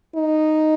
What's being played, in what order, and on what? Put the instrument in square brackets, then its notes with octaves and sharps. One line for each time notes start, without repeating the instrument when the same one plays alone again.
[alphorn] D#4